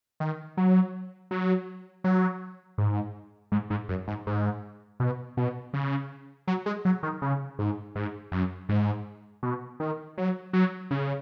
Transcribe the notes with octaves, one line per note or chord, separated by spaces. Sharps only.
D#3
F#3
F#3
F#3
G#2
G#2
G#2
F#2
G#2
G#2
B2
B2
C#3
F#3
G#3
F#3
D#3
C#3
G#2
G#2
F#2
G#2
B2
D#3
F#3
F#3
C#3